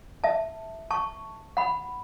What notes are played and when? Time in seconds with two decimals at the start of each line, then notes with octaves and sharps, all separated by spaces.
0.24 E5 A5
0.91 A5 C#6
1.57 F#5 B5